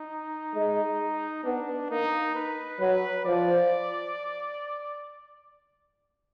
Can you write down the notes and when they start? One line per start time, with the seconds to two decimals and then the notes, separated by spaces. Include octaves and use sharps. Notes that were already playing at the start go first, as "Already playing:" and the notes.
Already playing: D#4
0.55 G#3
1.44 B3 D4
1.90 A#3 D#4
2.35 B4
2.80 F#3 B4
3.25 F3 D5